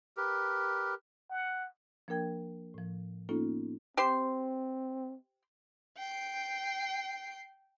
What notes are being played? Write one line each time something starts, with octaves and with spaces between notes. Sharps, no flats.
G4 A#4 B4
F#5
F3 A#3 D4 A#4 G5 G#6
A2 F3
A#3 B3 C#4 D#4 F4 A4
C4 G4 C5 C6
G5 C7